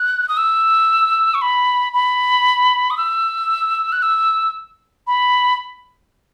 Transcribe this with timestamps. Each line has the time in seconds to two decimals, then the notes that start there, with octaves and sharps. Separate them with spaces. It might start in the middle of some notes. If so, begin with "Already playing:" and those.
Already playing: F#6
0.28 D#6
0.37 E6
1.34 C#6
1.42 B5
1.94 B5
2.90 D#6
2.97 E6
3.92 F#6
4.02 E6
5.07 B5